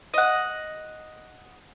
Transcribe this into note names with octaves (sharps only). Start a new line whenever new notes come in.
D#5 F#5